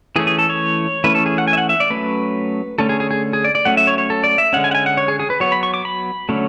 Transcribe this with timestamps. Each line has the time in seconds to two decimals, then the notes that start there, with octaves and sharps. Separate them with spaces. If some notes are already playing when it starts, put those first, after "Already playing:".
0.16 E3 A3 C#4 G#4
0.27 G#4
0.38 A4
0.49 C#5
1.04 E3 A3 C#4 B4
1.15 A4
1.26 G#4
1.38 F#5
1.48 G#5
1.53 E5
1.58 F#5
1.69 E5
1.80 D5
1.90 F#3 A3 C#4 B4
2.78 D3 A3 C#4 A4
2.89 G#4
3.00 G#4
3.11 G#4
3.33 G#4
3.44 D5
3.55 D5
3.65 F#3 A3 C#4 F#5
3.77 E5
3.87 C#5
3.98 C#5
4.10 A4
4.24 D5
4.38 E5
4.53 D3 G#3 C#4 F#5
4.64 G#5
4.71 F#5
4.75 G#5
4.86 F#5
4.97 C#5
5.08 G#4
5.20 G#4
5.30 B4
5.40 F#3 B3 C#5
5.52 B5
5.63 C#6
5.74 D6
5.85 B5
6.29 D3 F#3 A3 C#4